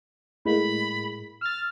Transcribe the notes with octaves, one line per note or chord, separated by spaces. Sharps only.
A2 G#3 A#3 B5
E6 F6 A6